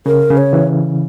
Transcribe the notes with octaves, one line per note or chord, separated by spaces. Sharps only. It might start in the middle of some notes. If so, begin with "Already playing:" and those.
C#3 A#4
C#3
C#5
E3